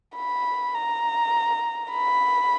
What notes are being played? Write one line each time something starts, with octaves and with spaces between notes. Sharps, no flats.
B5
A#5
B5